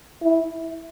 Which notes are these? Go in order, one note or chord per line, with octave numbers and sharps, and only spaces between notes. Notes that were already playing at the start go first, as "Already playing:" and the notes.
E4